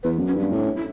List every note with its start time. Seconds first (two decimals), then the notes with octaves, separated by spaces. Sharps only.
0.03 E2 B4
0.19 F#2
0.27 C#4
0.36 G2 B3
0.52 A2 C#4
0.60 D4
0.64 C#4
0.76 E4